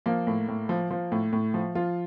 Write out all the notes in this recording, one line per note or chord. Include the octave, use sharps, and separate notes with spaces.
F3 A#3
A2
A2
F3
F3
A2
A2
F3
F3 F4